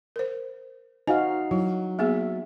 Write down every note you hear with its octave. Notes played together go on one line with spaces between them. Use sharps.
A#4 C5
D#4 F#4 C5 F5 G#5
F#3 E4
A#3 B3 G#4 E5